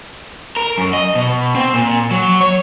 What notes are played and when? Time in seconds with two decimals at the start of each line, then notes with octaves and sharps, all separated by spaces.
0.56 A#4
0.78 F#2
0.93 D#5
1.15 B2
1.55 C4
1.74 A#2
2.11 F#3
2.41 C#5